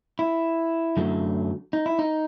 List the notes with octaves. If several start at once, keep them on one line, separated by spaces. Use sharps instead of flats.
E4
F#2 D3 F#3 A3
D#4
E4
D#4